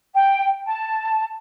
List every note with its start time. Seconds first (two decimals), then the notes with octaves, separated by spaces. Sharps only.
0.14 G5
0.67 A5